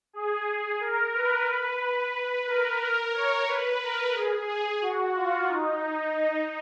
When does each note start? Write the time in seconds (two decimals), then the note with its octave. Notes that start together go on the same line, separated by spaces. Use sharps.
0.13 G#4
0.47 G#4
0.80 A#4
1.13 B4
1.81 B4
2.47 A#4
2.80 A#4
3.14 C#5
3.47 B4
3.81 A#4
4.14 G#4
4.47 G#4
4.81 F#4
5.14 F4
5.47 D#4
5.81 D#4